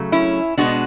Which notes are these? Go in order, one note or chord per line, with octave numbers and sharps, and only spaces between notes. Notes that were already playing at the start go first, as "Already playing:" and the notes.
Already playing: C#3 F#3 A3
C#4 E4
B2 G#3 B3 D4 F#4